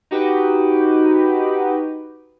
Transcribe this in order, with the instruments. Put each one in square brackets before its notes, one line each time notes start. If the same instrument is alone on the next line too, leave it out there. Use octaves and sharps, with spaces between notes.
[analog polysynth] D#4 F#4 G4 B4